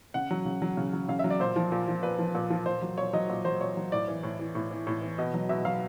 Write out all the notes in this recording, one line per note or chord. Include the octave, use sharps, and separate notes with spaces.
C#3 F#5
F#3
C#3
F#3
C#3
F#3
C#3 F5
E5
F#3
D5
A#2 C5
F3
A#2
F3
A#2 B4
F3
A#2
F3
A#2 C5
F#3
A#2 C#5
F#3 D#5
A#2
F#3 C5
A#2 C#5
F#3
A2 D5
E3
A2
E3
A2
E3
A2
E3
B2 D#5
F#3
B2 E5
F#3 F5